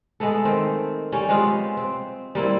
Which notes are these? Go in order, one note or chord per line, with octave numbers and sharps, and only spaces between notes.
G#3 A3 B3 A4
D#3 C4
G3 C#4 G4
G#3 B3 C4 F4
C4
G3 A#3 C4 E4